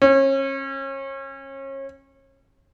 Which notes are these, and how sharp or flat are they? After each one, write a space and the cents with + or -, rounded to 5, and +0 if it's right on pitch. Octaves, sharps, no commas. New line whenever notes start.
C#4 -35